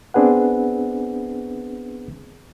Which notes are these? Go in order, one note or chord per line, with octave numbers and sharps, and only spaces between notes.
B3 C4 D4 G#4 B4 F#5